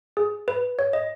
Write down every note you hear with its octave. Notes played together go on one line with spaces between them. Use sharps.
G#4
B4
C#5
D#5